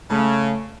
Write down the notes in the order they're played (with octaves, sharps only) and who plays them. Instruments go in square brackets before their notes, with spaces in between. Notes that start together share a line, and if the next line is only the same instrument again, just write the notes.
[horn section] C#3 [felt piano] A3